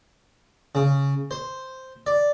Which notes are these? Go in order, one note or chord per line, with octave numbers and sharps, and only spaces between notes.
C#3
C5
D5